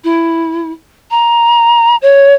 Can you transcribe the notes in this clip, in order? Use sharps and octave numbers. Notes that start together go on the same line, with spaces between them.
E4
A#5
C#5